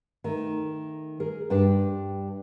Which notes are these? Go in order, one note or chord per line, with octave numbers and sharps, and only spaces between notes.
D#3 A3
G#4 A#4
G2 D4 G5